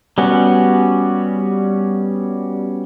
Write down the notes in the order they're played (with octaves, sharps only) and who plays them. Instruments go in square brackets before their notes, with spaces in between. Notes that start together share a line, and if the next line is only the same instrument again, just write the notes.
[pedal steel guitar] G3 B3 C#4 F#4